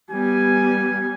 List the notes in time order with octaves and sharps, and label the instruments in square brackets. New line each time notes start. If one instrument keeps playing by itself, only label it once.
[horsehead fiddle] G3 B3 [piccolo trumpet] G#5